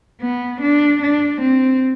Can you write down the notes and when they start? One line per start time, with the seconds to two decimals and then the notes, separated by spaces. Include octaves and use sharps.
0.21 B3
0.61 D4
1.02 D4
1.41 C4